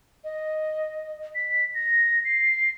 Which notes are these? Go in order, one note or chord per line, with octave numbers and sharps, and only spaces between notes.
D#5
B6
A#6
C7